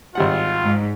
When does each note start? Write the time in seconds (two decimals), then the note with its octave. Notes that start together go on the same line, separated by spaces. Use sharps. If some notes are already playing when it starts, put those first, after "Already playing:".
0.15 G#1 G3 F4 F#5
0.64 G#2